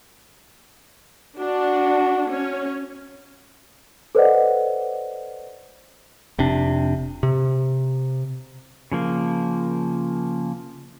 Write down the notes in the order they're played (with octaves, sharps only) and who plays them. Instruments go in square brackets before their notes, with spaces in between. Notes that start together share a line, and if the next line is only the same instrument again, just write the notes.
[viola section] D4 [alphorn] F#4
[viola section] C#4
[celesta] A4 B4 C5 D5 D#5 F#5
[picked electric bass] F1 C3 D4
C3
[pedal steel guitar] C#3 F3 A#3